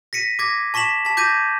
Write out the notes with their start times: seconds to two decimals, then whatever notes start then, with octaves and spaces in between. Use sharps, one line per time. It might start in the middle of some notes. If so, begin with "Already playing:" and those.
0.13 A#6 B6 C#7 D#7
0.39 D6 G#6 A#6
0.74 A5 C#6 B6 E7 F#7
1.05 A5 B6
1.17 D6 G6 G#6 A#6 D#7